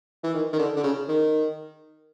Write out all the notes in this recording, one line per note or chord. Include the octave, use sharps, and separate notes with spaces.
E3
D#3
D#3
D3
D3
C#3
D#3